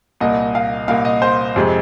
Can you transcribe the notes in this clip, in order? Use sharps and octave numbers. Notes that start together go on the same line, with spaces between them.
C2 A#2 A#3 D#5
F5
C2 A#2 A#3 F5
D#5
C5
F2 C3 G#3